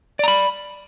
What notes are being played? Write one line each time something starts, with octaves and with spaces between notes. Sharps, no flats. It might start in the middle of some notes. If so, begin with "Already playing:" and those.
D5 A#5 B5